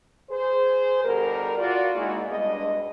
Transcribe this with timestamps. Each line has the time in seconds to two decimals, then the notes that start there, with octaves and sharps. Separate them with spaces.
0.31 G#4 C5
1.05 B2 D3 G3 A#4
1.57 F4 F#4 D5
1.95 G#3 A#3 D#4 E4 F#4 G#4
2.27 G2 G#3 B3 D4 D#5